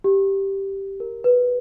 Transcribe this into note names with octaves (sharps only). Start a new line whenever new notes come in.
G4
A#4
B4